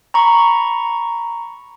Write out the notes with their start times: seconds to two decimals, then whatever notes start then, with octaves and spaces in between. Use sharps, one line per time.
0.14 A#5 B5 C#6